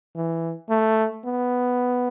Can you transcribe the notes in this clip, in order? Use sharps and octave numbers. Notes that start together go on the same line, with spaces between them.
E3
A3
B3